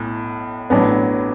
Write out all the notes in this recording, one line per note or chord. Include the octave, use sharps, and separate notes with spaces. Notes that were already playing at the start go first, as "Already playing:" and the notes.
Already playing: B1 A2
A1 A2 F#3 B3 D4